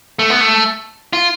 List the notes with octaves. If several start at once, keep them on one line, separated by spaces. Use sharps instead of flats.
A3
B3
A3
F4